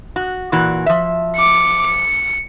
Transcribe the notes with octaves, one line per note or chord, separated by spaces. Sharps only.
F#4
A#2 E3 F#4
F3 E5
D6 C#7
C#7